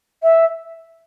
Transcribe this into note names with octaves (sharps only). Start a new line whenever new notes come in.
E5